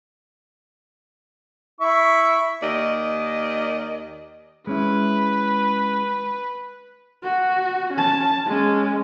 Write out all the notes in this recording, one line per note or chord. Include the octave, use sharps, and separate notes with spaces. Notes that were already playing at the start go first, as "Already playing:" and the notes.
E4 E5 C#6
D#2 D5 D#5
G#3 C#4 E4 B4
F#4
C#4 A5
G#3 C#4